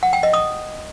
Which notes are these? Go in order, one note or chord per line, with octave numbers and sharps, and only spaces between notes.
F#5
G5
D#5
D#6